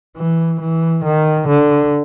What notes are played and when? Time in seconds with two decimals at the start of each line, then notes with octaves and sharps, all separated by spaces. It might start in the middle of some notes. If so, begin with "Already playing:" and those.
0.17 E3
0.61 E3
1.05 D#3
1.48 D3